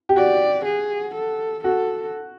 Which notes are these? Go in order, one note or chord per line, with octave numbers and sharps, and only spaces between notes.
G4
F#4 D5
G#4
A4
F#4 A4